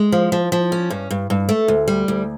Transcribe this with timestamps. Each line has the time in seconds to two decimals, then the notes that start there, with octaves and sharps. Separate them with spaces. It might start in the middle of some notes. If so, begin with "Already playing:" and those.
Already playing: G#3
0.12 F3
0.32 F3
0.52 F3
0.72 C#4
0.90 G2
1.11 G2
1.30 G2
1.49 A3
1.68 D2
1.88 G3
2.08 D2